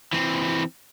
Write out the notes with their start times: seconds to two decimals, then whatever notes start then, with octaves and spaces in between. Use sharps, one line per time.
0.13 E3 C4